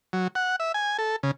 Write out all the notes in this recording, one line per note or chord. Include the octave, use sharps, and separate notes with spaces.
F#3
F#5
E5
G#5
A4
C#3